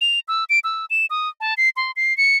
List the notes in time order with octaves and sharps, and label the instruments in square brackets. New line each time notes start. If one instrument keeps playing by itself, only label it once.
[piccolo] F7
E6
D7
E6
E7
D#6
A5
C7
C6
C7
C#7